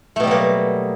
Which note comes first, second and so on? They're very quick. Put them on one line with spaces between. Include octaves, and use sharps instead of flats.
A3 B2 G3 F#3 A#3